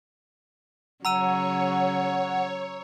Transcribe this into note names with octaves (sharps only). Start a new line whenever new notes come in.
C#3 F#3 C#5 F#5 A#5 E6 D#7